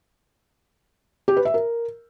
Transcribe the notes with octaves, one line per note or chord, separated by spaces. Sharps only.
G4
B4
E5
A#4